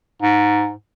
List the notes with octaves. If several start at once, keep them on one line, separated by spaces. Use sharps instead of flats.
G#2